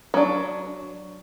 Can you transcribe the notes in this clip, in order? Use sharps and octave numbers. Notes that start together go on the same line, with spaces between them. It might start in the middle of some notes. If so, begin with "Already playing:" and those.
F#3 D4